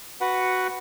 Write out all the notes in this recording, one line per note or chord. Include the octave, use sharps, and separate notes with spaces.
F#4 B4 F#5